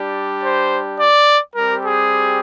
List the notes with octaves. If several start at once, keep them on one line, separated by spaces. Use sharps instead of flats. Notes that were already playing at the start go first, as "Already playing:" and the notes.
Already playing: G3 D4 G4
C5
D5
G3 C4 G4 A#4
G#4